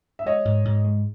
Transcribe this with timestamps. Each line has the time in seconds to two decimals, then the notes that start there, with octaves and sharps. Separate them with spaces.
0.19 E5
0.25 G#3 C#5 D#5
0.45 G#2
0.65 G#2
0.84 G#3